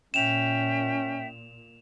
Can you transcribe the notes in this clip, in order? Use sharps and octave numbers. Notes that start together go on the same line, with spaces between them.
A#2 C#4 E5 G5 E7 F7